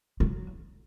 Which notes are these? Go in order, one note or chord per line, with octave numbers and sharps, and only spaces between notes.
F#3